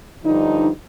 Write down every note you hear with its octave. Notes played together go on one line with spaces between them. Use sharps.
G2 D3 F3 D#4